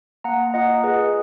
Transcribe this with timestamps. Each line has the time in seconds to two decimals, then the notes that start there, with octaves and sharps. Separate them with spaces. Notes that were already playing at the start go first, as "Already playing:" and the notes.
0.24 A#3 F#5 A#5
0.54 F4 D#5 F#5
0.84 G#4 B4 D#5